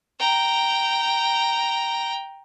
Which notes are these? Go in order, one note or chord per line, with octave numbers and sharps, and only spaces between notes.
G5 A#5